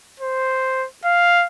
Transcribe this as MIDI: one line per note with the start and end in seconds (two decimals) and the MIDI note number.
0.20 0.87 72
1.05 1.46 77